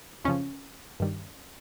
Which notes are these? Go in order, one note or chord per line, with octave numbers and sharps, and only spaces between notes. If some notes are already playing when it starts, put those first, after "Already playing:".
F2 C#3 F3 C#4
G2 D#3 G3